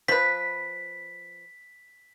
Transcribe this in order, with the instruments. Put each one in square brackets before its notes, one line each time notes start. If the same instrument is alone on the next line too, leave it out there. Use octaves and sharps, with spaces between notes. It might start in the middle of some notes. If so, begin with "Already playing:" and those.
[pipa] F3 B4 [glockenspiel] B6